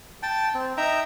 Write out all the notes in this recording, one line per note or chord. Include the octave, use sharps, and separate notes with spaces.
G5 A5
C4
D#4 E5 G5 A#5